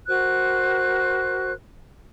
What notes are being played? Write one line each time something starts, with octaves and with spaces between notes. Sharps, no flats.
F#4 A#4 C5 F#6